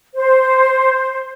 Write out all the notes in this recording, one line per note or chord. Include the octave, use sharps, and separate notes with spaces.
C5